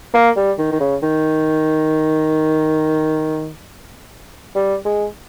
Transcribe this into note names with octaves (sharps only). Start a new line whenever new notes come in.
A#3
G3
D#3
D#3
C#3
D#3
G3
G#3